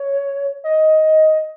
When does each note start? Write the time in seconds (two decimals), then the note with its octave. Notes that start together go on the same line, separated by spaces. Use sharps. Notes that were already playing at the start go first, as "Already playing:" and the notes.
Already playing: C#5
0.64 D#5